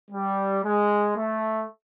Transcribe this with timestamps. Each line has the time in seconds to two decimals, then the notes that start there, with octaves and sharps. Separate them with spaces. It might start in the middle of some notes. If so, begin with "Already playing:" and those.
0.11 G3
0.64 G#3
1.17 A3